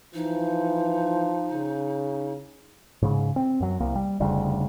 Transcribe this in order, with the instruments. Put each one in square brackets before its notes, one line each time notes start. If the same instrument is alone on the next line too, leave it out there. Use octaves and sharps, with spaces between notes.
[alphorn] E3 [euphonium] F3 [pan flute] D#4
[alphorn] C#3
[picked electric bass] G#2 C#3
C4
F#2 F#3
C2 A#3
G3
F1 D2 C#3 G3